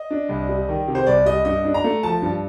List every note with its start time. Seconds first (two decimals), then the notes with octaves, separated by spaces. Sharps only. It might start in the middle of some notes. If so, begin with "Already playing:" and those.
Already playing: D#5
0.11 D4
0.29 C2
0.49 G3
0.69 D#3
0.87 C3
0.95 C5
1.07 C2 D5
1.26 G3 D#5
1.45 G2 D#5
1.65 D4
1.74 A#5
1.84 A3
2.03 F3 A5
2.22 G2